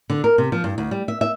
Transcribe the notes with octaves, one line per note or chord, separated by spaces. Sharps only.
D3
A#4
C3
F3
G2
D2
G3
E5
E5